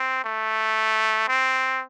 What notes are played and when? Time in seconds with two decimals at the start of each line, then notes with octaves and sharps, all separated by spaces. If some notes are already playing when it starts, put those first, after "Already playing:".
Already playing: C4
0.24 A3
1.28 C4